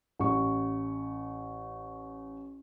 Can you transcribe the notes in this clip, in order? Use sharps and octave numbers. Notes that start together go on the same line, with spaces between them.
A1 C#6